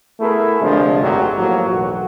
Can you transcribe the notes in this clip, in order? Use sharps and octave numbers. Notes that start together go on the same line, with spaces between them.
A3 B3 E4 G#4 A#4
D2 C3 F3 G#3 D4
G#1 F#2 F#3 A3 G4
A2 F3 F#3 A#3 F#4
B1 E2 F#4